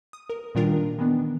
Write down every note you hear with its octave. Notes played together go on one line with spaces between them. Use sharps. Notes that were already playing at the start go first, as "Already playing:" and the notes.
D#6
A#4
A#2 D#3 G3 D4 F4 A#4
D#3 E3 B3 D4